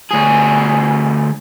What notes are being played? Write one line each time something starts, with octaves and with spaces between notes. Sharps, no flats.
D2 G#4